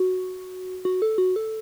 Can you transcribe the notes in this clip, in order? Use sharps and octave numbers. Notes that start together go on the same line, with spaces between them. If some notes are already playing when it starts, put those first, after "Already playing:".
Already playing: F#4
F#4
A4
F#4
A4